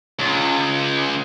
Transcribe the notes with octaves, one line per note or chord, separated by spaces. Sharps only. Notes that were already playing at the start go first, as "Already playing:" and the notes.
C#2